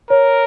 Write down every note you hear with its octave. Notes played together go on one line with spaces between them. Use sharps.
A#4 C#5